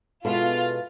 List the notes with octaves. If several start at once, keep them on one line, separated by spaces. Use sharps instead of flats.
B2 G#3 B3 E4 F4 A4